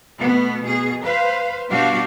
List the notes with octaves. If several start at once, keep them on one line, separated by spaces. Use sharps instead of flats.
B2 A3 B3
B2 G#4
B4 C5 F5
B2 G3 D4 F#4 G4 F5